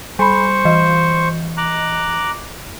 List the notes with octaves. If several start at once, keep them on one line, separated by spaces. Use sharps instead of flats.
G3 C5 B5 C#6
E3 D#5
A#5 D6 F#6